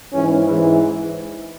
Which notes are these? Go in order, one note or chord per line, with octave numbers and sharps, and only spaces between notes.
G#2 E3 C#4
G#2 E3 E4